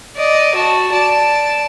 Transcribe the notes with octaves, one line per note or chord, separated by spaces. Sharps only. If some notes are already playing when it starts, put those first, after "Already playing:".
D5 D#5
F#4 A5
D5 A5